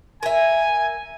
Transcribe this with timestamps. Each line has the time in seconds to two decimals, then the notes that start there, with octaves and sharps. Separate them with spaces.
0.23 A#4 E5 G#5